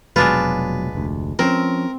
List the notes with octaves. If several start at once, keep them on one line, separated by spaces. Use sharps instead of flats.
F1 B2 F#3 G#3 D4 F4 B4
F1 D2
F3 C4 C#4 A#4